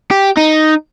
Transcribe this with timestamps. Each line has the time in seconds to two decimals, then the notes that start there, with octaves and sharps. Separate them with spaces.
0.11 G4
0.37 D#4